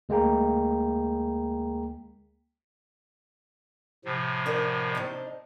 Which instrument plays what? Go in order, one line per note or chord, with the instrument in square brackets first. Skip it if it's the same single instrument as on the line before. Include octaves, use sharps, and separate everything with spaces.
[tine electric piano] D2 G#3 A#3 G#4 G5 A#5
[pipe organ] A2 C3 F3
[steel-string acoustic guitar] D3 D4 A#4
C4 D4 D#4